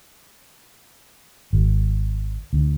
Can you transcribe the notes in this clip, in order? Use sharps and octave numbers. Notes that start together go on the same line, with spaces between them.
G#1
D2